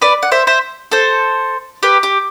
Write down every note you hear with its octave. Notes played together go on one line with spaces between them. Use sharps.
B4 D5
F#5
C5 E5
C5 E5
A4 C5
G4 B4
G4